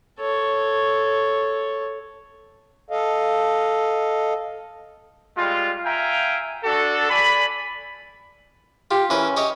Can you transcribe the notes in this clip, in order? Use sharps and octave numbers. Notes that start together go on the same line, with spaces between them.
A4 C#5
A4 D#5 F5
G3 G#3 F4
E5 F5 G5 G#5 A#5
D4 F#4 A4
D5 G#5 B5
F4 G4
E3 C#4 A#4 B4
G4 C#5 D#5